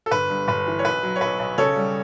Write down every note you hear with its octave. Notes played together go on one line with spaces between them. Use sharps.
A4
G1 B4
G2
G1 B4
E3
C#5
B1 B4
F#3
C#5
B1 B4
B1
C#3 A4 C#5
G3